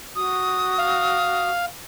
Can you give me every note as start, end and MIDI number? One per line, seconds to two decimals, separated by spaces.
0.16 1.51 66
0.16 1.49 87
0.78 1.65 77